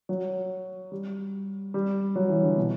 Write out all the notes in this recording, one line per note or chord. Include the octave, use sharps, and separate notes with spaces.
F#3
G3
G3
F#3
E3
D3
B2